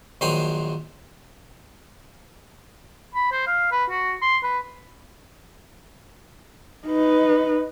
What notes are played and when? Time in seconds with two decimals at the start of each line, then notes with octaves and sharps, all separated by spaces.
0.21 A#1 D#3 F#3 C5 C#5 G#5
3.15 B5
3.32 C5
3.47 F5
3.72 B4
3.90 F#4
4.22 C6
4.43 B4
6.87 D#4 B4